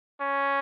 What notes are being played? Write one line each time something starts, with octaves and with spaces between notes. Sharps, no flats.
C#4